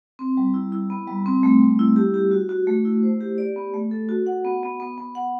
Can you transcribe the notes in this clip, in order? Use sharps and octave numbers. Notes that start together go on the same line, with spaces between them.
C4
G3
E4
E4
B3
G3
C4
A3
G3
E4
G4
G4
F#4
F#4
A3
E4
C5
G4
D5
B3
A3
A4
F#4
F#5
B3
B3
B3
B3
F#5